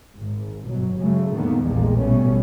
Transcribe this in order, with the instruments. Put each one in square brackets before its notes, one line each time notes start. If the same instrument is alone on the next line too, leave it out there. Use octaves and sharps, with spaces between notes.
[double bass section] G#1 G#2
G1 B2 F#3
F#2 C#3 F#3 G#3 A3
F2 A2 D3 D#3 A#3 B3
A#1 E2 F3 G3 G#3 A#3
A1 B2 G3 A3 B3 C#4